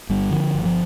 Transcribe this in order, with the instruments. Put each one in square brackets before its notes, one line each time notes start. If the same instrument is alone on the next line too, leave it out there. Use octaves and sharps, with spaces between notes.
[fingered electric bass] G1 G3
D3 F3
G1
F3